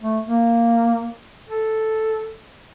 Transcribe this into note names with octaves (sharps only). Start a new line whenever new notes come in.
A3
A#3
A4